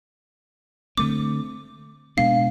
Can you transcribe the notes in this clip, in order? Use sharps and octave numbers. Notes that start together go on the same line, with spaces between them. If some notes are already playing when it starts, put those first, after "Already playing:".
D3 A3 C4 D6
B2 G#3 B3 D4 F5